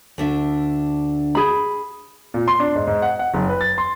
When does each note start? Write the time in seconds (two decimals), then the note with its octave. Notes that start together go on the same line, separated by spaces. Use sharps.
0.18 D2 D4 E5
1.35 G#4 B5
2.34 A#2
2.48 C6
2.60 D4
2.75 G#2
2.87 G#2
3.02 F#5
3.19 F#5
3.34 F#1
3.49 B4
3.61 A6
3.78 C6